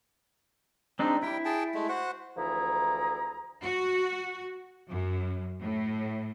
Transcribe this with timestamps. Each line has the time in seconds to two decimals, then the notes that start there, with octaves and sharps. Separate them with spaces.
0.99 G#3 C4 D4 D#4
1.23 G3 E4 G5
1.45 G#4 G5 A5
1.74 G#3 A3
1.89 F#4 C5 F#5
2.37 D2 E3 F3 E4 G#4 A#5
3.64 F#4
4.90 F#2
5.60 A2